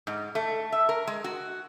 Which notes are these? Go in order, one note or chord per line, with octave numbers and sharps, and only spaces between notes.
G#2
A3
E5
A#4
G#3
F#4